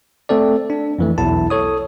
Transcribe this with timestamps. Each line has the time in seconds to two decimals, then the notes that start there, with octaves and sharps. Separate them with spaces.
0.29 A3 C4 A4 D5
0.70 D4
0.99 F2 E3 A3
1.18 B1 E2 E4 A5
1.50 A4 C#5 D#6